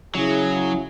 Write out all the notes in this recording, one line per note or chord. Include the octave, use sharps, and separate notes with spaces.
C#3 F#3 E4 G#4